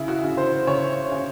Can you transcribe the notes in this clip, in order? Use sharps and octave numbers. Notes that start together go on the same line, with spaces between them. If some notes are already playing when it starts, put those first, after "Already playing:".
Already playing: C#3 E4
F#4
C#3
C5
C#3 C#5
C#3